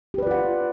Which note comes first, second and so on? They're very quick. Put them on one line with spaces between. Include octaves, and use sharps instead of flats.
G4 B4 D5 F4 F#5